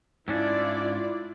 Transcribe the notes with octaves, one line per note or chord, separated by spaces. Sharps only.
G#2 C#4 D4 E4 F4 D5